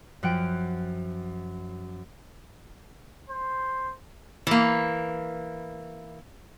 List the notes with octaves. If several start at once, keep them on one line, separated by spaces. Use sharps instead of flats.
F#2 F3 F#5 G5 D7
C5
E3 A#3